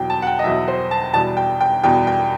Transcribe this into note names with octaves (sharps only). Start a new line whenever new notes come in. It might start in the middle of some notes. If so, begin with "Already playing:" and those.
Already playing: E2 B2 F#3 G5
A5
F#5
G5
D#5
E2 B2 F#3 E5
C5
A5
E2 B2 G3 A5
G5
G5
E2 B2 G3 G5
G5